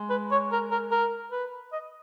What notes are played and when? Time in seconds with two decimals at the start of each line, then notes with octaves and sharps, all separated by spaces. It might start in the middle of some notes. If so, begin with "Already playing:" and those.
Already playing: G#3
0.10 B4
0.31 C#5
0.52 A#4
0.71 A#4
0.91 A#4
1.31 B4
1.72 D#5